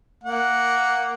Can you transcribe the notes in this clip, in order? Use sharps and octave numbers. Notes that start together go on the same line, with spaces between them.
A#3 F#5